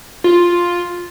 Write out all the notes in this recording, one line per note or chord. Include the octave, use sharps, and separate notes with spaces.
F4